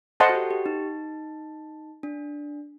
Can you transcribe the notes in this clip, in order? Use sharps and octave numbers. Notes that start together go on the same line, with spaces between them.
A4 C5 D#5 F#5 A5 C6
F#4
G4
G4
D#4
D4